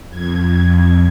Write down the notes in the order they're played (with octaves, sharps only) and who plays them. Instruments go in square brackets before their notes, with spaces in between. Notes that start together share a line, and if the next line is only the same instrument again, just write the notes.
[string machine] F2 G#6